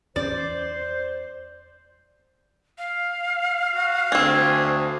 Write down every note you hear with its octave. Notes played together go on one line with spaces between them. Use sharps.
E2 C#4 C5 D5
F5
F#4
D2 C4 D4 G#5